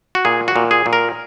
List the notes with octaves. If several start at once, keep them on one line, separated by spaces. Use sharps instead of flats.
F#4
A#2 G#4
F#4
A#2
G#4
A#2
A#4